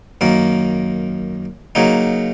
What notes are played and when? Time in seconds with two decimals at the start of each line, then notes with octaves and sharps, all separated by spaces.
0.21 F#2 D#3 A#3
1.75 C#3 F#3 A#3 D#4